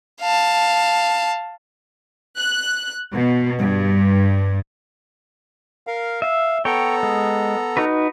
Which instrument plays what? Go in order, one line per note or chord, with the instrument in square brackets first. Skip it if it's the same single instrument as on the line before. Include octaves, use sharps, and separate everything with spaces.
[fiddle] F5 A5
[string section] F#6
B2
G2
[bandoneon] A#4 F5
[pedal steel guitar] E5 [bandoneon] F5
[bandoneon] B3 A4 A#5 [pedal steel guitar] C#5 G5
[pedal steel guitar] G#3
D#4 F#4 B4